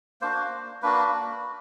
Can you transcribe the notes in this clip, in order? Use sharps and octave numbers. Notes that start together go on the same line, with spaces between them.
A#3 D4 F#4 C5
A#3 D4 F#4 B4